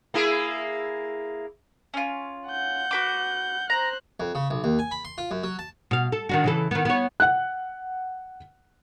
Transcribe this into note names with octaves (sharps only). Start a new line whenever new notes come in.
A#3 E4 G#4
C#4 F4
F#5 G6
F#4 B4 D6
C5 A#5 F#6
F2
C#3
B1
D#2
G#5
B5
C6
F4
F#2
F#3
A5
B2 F5
A4
D#3 D4 F#4
C#3 E3 A4
D#3 B3
B3 C#5
F#5 F#6